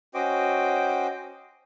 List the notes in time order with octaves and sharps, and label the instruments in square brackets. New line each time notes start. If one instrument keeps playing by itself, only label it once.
[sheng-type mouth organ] C#4 F#4 C5 D#5 G5 D6